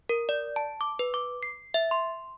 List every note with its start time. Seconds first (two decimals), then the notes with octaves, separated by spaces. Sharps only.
0.09 A#4
0.29 D5
0.56 A5
0.81 D6
0.99 B4
1.14 D6
1.43 C7
1.74 E5
1.91 C6